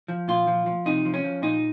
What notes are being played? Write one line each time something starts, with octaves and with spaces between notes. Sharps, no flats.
F3
A#2 F4
F3
F3
C3 D#4
F3
C#4
F3
A#2 D#4